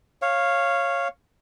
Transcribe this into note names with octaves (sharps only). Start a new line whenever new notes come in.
C#5 F5